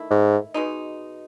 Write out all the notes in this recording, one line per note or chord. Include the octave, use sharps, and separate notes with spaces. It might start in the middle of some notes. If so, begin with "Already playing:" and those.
Already playing: D#3 A3 E4
G#2
B2 G#3 D#4